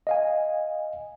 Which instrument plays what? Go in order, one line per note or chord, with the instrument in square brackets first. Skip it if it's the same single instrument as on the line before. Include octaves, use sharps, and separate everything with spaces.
[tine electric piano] D#5 F5 G#5